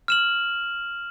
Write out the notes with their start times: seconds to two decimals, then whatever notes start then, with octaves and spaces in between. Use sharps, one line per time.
0.08 F6 E7 F#7